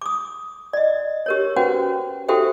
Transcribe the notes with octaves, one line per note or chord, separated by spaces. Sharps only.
D6 D#6
D5 D#5
G4 A#4 C#5
C#4 F#4 B4 C5 F#5 G5
F#4 G4 A4 C5 E5 G5